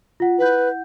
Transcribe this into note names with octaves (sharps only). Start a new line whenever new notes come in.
F4 F#5
E4 B4 F#5 G6